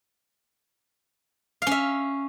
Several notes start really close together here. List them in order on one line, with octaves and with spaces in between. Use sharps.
F5 C#4 E5